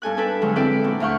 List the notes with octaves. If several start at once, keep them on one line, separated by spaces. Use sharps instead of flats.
G2 A4 G#5 F#6
D4 A4 B4 G5
D3 F3 F#3 G#3 F4
C4 E4 A4 B4 D5 G5
A#2 D4 F#4
D2 F4 F5 F#5 C#6 G6